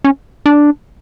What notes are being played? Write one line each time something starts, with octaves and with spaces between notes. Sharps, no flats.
C#4
D4